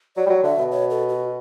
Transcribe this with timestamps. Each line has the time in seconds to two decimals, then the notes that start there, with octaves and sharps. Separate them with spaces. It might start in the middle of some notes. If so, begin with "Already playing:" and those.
0.16 F#3 D5
0.26 G3
0.30 F#3
0.44 D3 E5
0.58 B2
0.72 C#5
0.90 A4
1.09 F#4